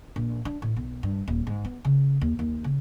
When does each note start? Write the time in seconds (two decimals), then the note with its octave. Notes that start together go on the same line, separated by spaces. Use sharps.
0.16 A#1
0.45 D4
0.62 A2
0.76 B1
1.03 G2
1.28 D#1
1.47 G#2
1.65 B3
1.85 C#3
2.21 D#2
2.39 D#2
2.64 C#3